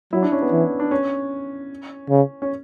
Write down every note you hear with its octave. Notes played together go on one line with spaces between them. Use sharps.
F#3 E4
D4
C#4
B3
E3
D4
C#4
C#3
C#4